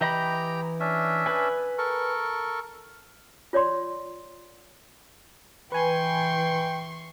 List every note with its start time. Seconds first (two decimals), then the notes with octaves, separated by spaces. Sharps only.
0.01 E3 G4 D#5 G5 A#5 B5
0.80 C#4 D4 E5
1.26 B4 G#5
1.78 A4 A#4 C#6
3.53 F4 C#5 D5 C6
5.72 E3 B4 G5 G#5 C6 C#6